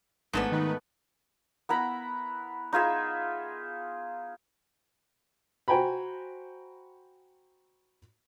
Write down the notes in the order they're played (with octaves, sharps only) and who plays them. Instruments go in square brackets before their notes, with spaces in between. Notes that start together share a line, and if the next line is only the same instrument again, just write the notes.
[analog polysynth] G#1 D4 E7 [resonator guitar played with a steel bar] G#2 A3 B3
[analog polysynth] D#3 D#4 B4
[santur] B3 E4 A#5 B5
D#4 F4 G#4 E5
[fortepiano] F#4 C5 G5 G#5 A#5 B5